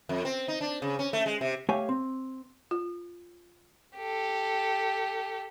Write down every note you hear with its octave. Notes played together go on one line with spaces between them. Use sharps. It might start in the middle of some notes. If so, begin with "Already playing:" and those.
F2
C4
D#4
D4
C#3
C#4
A3
G#3
C3
A3 G4 C#5 F5 G#5
C4
F4
G4 A4